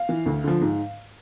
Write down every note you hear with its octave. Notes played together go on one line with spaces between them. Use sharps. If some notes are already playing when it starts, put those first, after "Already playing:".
Already playing: F5
E3
D2
D3 F3
G#2